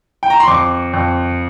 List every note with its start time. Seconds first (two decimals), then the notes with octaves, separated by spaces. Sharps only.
0.23 G5
0.30 A#5
0.40 C6
0.47 F2 D6
0.93 F2